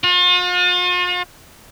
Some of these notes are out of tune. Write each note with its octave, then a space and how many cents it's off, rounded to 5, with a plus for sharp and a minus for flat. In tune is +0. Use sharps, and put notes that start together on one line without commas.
F4 +45